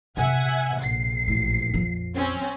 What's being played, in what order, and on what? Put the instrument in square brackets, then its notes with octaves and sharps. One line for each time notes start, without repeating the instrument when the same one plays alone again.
[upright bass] C3 [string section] E5 F#5 G#5
[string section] A#1 C7
[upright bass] A1
F2 F3
[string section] C4 C#4